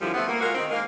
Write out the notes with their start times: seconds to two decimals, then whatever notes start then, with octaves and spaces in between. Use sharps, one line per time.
0.01 F#2 D3 F3 G3 E4
0.14 F3 A3 B3 C4
0.29 A#3
0.41 G#3 F4 F#4 A#4
0.55 D#3 C4
0.70 G#3 A#3 D#4 A#4 F5